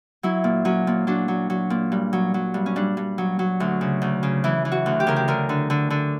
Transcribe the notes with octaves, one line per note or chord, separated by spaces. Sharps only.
F#3 E4
A#2
F#3 C#4
A#2
F#3 D4
F#3
F#3
A#2
G2
F#3
F#3
G2
C#4
G2 D4
G2
F#3
F#3
D2
C#3
D2
C#3
E3 E4
E3
F#4
D2
G4
C#3 A#4
G4
D3 A#4
D3
D3
D3